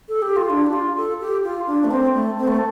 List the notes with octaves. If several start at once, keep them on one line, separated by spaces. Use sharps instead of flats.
A4
G4
F4
D4
G4
F4
A4
G4
F4
D4
A3
C4
A3
C4
A3